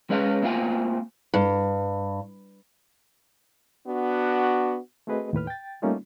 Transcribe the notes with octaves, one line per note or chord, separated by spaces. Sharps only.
G#3 C#4 B4 D#5 F5
A3 A#3 C4 F4 F5 G#5
G2
B3 D4 F#4
A3 C4 F#4 G#4 B4 D#5
D#2 A2 B4 F6
G5 A6
G3 A3 A#3 C#4 D#4 F4